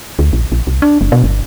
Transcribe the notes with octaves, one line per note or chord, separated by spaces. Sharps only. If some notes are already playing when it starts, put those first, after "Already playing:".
D2
A#1
A#1
C2
D4
F#1
B2
G1